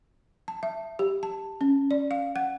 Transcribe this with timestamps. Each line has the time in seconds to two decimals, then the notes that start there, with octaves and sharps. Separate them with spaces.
0.48 A5
0.63 E5
0.99 G4
1.23 A5
1.61 C#4
1.91 D5
2.11 F5
2.36 F#5